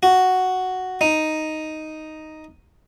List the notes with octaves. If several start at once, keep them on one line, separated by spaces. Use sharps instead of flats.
F#4
D#4